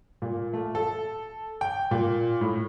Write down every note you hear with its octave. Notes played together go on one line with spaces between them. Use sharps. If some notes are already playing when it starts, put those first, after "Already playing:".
A#2
A3
A4
G5
A#2
A2